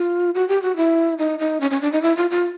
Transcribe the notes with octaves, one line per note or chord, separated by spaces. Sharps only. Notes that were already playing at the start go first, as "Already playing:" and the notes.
Already playing: F4
F#4
G4
F#4
E4
D#4
D#4
C#4
C#4
D4
D#4
E4
F4
F4